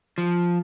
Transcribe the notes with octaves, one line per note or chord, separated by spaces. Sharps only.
F3